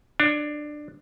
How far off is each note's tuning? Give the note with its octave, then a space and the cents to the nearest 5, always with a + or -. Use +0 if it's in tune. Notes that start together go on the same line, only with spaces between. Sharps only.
D4 +20 C#5 +35